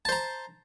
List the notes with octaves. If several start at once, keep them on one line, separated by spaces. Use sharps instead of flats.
C5 A5 A#5